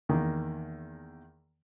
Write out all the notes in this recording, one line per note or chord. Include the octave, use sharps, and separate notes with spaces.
E2 D#3 A#3